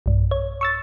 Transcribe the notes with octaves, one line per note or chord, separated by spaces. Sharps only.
B1 G2
C#5
C#6 E6 A6